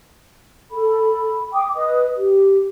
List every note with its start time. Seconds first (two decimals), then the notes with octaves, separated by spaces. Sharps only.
0.70 A4 B5
1.53 G5 D6 D#6
1.75 B4 D#5 D#6
2.17 G4